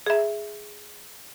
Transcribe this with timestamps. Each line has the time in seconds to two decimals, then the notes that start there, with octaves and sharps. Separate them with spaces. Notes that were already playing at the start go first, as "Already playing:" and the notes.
0.06 G#4 E5